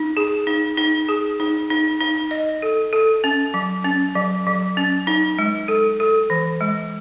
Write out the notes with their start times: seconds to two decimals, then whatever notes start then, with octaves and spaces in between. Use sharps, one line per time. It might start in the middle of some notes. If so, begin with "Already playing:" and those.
Already playing: D#4
0.17 G#4
0.47 D#4
0.77 D#4
1.09 G#4
1.40 D#4
1.70 D#4
2.01 D#4
2.31 D#5
2.62 A4
2.93 A4
3.24 C#4
3.54 F#3
3.84 C#4
4.15 F#3
4.47 F#3
4.77 C#4
5.07 D#4
5.39 G#3
5.68 A4
6.00 A4
6.30 E3
6.61 G#3